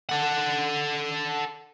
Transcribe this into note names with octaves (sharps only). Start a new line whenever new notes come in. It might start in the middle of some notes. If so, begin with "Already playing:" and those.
A4 F#5